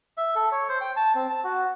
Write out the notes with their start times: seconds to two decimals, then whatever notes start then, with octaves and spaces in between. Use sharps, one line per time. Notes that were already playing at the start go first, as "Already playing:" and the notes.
0.17 E5
0.35 A4
0.52 C#5
0.69 C5
0.81 G5
0.96 A5
1.15 C4
1.30 A5
1.44 F#4